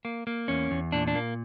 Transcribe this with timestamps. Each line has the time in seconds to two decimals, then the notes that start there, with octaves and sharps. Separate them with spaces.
0.05 A#3
0.27 A#3
0.48 E2 C#4
0.71 E2
0.92 A#2 D4
1.07 D4
1.15 A#3